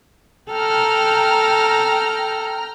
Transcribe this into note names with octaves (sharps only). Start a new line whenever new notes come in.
A4 G5 A#5 F6